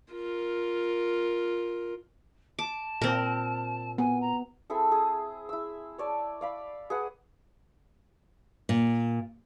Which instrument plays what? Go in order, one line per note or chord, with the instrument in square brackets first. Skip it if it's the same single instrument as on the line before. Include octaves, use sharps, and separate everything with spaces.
[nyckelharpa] F4 A#4
[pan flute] A5 [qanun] D6
[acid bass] A#2 [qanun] C4 A#4
[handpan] B3 [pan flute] G#5
[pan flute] A#5
[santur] C4 E4 G#4 A4
G#4
E4 E6
C#5 D5 A5
D5 F5 B5
G#4 B4 F#5
[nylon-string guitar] A#2